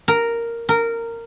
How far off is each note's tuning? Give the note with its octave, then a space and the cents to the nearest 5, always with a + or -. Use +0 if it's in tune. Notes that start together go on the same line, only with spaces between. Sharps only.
A#4 -5
A#4 -15